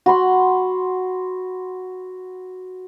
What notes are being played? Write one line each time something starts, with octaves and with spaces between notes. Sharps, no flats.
F#4 B5 C6